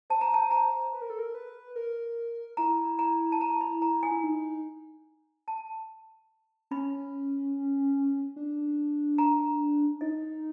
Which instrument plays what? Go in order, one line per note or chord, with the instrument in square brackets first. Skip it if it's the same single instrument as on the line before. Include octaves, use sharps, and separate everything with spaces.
[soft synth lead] C5 [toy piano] A5
[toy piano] A#5
A5
A#5
[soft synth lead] B4
A#4
A4
A#4
B4
A#4
[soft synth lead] E4 [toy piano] A#5
[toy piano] A#5
A5
A#5
B5
A#5
G#5
[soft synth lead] E4
D#4
[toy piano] A5
[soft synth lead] C#4 [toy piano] B5
[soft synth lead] D4
[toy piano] A#5
[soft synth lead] D#4 [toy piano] D#5